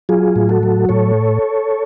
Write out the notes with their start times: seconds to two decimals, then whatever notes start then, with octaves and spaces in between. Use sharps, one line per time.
0.09 F#3 F4 G#4
0.36 A2
0.49 F#4 A4
0.63 F#3
0.89 A2 A4 C#5